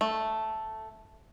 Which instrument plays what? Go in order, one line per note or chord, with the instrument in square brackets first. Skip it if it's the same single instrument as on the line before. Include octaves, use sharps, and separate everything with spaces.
[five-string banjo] A3